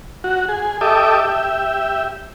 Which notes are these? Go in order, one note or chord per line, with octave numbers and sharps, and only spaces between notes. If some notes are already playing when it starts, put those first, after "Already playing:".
F#4
G#4
G4 A4 D#5 E5 D6
G4 E5